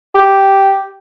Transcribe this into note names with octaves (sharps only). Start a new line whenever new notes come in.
G4